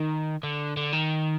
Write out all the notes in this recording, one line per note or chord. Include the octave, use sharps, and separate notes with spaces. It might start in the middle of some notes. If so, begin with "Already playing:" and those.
Already playing: D#3
D3
D3
D#3